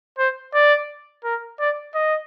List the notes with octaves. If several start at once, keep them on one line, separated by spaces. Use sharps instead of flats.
C5
D5
A#4
D5
D#5